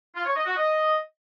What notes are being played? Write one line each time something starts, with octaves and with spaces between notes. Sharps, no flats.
F4
C#5
D#5
F#4
D#5